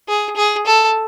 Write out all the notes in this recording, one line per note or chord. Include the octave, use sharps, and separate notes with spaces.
G#4
G#4
A4